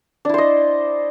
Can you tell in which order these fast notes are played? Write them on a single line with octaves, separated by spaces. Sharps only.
D4 E4 C5 D#5